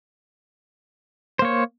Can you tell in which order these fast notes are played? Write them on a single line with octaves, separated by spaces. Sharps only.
C5 A#3 C#5